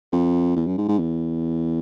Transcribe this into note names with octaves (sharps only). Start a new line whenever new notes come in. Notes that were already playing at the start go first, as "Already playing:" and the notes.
F2
E2
F#2
G#2
G#2
E2